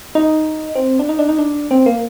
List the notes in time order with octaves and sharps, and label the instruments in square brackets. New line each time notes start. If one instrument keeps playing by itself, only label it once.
[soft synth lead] D#4
C4
D4
D#4
D4
D#4
D4
C4
A#3